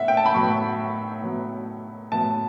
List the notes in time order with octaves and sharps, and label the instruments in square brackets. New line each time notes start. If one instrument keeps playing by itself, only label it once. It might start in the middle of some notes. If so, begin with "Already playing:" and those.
Already playing: [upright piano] A2 B3 E5 F#5
G5
A5
B5
A2 F#3 B3 C#6
A2 F#3 B3
A2 F#3 B3 A5